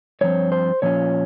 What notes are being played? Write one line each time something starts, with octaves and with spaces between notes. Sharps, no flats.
G2 F3 C4 C#5
C5
A#2 F3 C#4 F4 C#5